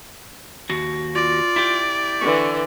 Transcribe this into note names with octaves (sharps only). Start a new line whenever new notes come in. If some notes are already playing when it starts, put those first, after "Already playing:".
D#2 F#4
F4 D5
E4 G4
D3 E3 C#6